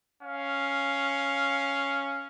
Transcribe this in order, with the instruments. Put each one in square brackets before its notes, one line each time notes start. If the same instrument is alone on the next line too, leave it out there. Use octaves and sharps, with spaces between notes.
[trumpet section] C#4 F5